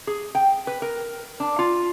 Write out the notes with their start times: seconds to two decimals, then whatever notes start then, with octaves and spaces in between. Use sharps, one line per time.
0.07 G#4
0.35 G5
0.67 B4
0.82 A#4
1.40 D4
1.59 F4